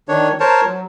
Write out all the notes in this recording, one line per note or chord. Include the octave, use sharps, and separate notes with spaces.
D#3 D4 C#5
A#4 C5 C#5 A5
F#3